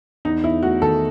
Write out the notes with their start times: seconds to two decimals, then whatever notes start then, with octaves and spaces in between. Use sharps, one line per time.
0.25 E2 D#4
0.43 E2 E4
0.62 A3 F#4
0.81 D#3 A4